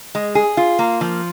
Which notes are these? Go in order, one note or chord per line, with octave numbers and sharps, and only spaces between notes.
G#3
G#4
F4
A#3
F3